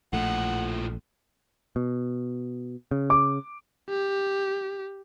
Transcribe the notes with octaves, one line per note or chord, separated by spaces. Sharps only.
A#1 A2 F3 A3 F#5
B2
C#3
D6
G4